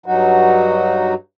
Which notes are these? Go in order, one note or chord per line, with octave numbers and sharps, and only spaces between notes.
G2 F#3 D#4 F#4